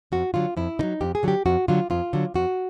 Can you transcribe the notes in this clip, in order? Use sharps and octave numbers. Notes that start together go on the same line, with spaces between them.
F2 F#4
D3 F#3 F4
F2 E4
D3 F#3 D#4
F2 G4
G#4
D3 F#3 G4
F2 F#4
D3 F#3 F4
F2 F4
D3 F#3
F2 F#4